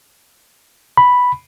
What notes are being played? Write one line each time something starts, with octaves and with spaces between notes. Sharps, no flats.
B5